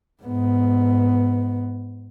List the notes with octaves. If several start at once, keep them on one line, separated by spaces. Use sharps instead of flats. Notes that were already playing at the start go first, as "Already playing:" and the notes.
G#2 B3